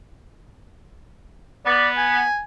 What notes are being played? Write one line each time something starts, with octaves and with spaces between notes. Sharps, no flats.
B3 D5
G#5